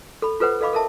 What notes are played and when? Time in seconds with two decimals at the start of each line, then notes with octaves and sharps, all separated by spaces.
0.22 A4 B5
0.40 F4 A4 B4 C5 F#5
0.61 A4 D#5 F5 B5 D6
0.73 A4 A#4 E5 A5